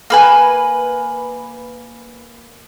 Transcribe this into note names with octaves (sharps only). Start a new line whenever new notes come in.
A#3 B4 G#5